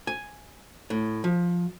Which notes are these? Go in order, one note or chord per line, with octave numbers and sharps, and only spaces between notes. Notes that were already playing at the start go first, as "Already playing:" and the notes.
G#5
A2
F3